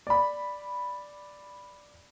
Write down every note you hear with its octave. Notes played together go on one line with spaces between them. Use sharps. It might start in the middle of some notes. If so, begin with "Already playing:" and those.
D5 B5